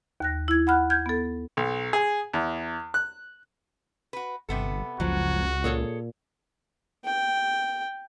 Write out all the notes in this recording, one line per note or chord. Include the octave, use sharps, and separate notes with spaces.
D#2 F#6 A#6
E4 G#6
F#5 B5 F6 F#6
F6 G6 G#6
B3 A4
B1
G#4
E2
F#6
F#4 B4
G1 C3 B3 A4
F#1 C#2 F3 F#3 F#4
A#2 G#4 A4 C#5
G5